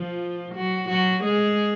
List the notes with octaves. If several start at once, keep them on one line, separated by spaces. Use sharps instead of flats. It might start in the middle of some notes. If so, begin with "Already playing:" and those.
Already playing: F3 F4
F#3 F#4
F#3 F#4
G#3 G#4